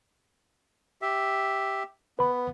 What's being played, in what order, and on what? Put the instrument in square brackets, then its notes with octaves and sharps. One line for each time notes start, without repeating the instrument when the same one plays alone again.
[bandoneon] G4 E5
[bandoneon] B3 [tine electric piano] B4 B5